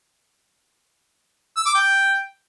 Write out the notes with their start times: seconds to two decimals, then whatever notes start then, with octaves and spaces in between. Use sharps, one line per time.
1.57 E6
1.66 D6
1.75 G5